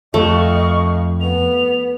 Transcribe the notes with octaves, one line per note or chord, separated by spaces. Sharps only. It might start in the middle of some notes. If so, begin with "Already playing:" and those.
F2 A3 D#5 F5 C#6
B3 F7